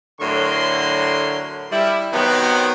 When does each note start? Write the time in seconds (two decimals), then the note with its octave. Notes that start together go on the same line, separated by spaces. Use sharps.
0.20 A2 D3 F#3 A#4 C6
1.71 G3 E4
2.12 C3 D#3 F#3 B3